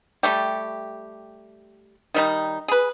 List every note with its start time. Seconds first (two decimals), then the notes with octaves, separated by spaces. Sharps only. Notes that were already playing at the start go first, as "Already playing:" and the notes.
0.23 G3 A3 G4
2.14 D#3 G3 D#4
2.68 G#4 B4